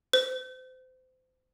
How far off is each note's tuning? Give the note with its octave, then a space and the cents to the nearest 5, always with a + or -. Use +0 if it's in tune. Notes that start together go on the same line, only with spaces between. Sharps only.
C5 -30